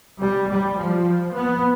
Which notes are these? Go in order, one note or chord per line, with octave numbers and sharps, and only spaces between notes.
G3
G3
F3
B3